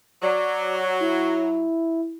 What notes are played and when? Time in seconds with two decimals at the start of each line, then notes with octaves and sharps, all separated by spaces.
0.23 F#3 D5
1.00 E4